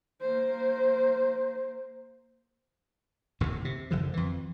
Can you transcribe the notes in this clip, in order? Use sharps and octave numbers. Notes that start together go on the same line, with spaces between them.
A#3 C5
D1 D#2 A2 C3
C3
F#1 D3 F3
F2 E3